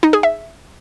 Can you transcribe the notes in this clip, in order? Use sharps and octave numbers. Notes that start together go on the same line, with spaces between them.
D#4
G#4
E5